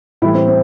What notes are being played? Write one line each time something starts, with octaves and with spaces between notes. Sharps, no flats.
A2 E3 G3 E4
C4
C4